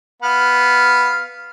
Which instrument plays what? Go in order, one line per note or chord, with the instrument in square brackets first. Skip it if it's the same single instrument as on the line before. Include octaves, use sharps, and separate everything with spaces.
[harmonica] B3 F5